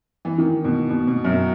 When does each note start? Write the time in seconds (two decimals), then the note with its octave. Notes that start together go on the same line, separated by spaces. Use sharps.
0.25 E3
0.38 D#3
0.64 B2
0.90 B2
1.07 B2
1.25 F#2